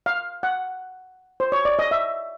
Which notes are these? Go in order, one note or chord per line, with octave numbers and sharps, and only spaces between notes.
F5
F#5
C5
C#5
D5
D#5
E5